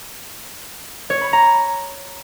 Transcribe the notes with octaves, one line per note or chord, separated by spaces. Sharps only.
C#5
B5
A#5